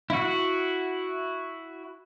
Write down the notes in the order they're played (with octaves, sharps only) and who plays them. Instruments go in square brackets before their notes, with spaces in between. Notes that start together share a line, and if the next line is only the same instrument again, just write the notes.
[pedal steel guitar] E4 F#4